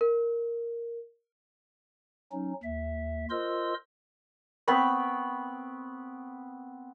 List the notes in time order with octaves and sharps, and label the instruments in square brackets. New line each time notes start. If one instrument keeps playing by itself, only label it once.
[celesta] A#4
[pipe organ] F#3 C#4 D#4
D#2 E5
F4 A#4 C5 D#5 C6 E6
[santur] B3 C4 B5 C#6